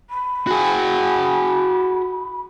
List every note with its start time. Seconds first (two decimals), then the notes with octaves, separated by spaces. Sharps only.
0.10 B5
0.47 F#4 G#4